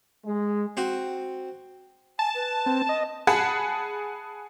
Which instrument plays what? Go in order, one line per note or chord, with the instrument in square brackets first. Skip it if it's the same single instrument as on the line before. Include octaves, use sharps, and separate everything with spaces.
[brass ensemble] G#3
[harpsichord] C4 F#4
[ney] G#5 [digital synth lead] A5
[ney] B4
[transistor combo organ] C4
D#5
[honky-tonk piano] G#4 F#5 A5 B5